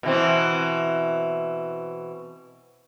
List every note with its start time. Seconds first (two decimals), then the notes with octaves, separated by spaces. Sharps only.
0.03 B2 E3 C4